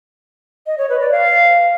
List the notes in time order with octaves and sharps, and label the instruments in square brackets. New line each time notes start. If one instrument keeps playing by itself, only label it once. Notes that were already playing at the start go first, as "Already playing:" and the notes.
[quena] D#5
C#5
B4
D5
F5